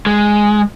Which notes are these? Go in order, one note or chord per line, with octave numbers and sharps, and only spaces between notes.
G#3